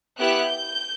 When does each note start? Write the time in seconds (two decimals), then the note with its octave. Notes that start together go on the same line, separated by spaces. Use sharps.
0.18 B3 E4 G4 F#6
0.47 G6